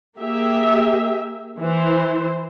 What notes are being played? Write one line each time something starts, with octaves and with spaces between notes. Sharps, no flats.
A#3 G4 G#4 E5
E3 C5